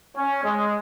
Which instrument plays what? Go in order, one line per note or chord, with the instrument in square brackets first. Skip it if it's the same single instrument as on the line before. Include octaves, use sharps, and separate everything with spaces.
[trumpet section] C#4
G#3